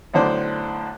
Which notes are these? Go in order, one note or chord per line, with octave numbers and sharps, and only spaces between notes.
B1 A2 D3 C5 D5